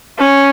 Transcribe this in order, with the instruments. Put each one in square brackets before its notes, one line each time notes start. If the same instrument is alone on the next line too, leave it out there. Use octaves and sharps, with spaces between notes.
[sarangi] C#4